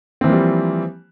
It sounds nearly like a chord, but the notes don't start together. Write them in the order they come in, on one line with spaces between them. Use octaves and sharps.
C4 E3 A#3 F3 G3